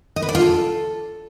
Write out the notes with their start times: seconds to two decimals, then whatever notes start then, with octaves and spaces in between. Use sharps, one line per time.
0.16 D#5
0.22 B4
0.29 D5
0.35 F4
0.41 A4